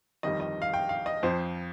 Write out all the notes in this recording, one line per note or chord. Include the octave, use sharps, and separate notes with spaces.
G1 F2 D#3 G3 D#5
D#5
F5
G5
F5
D#5
F2 F3 C5